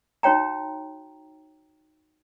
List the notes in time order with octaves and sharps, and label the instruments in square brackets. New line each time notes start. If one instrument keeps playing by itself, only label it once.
[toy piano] D#4 F#4 C#5 G5 A#5